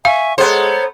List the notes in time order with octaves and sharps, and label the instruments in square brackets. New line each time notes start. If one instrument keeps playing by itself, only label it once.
[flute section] E5 G#5 C#6 [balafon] F5
[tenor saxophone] G#3 [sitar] B3 C5 [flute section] A4 C#5 A#5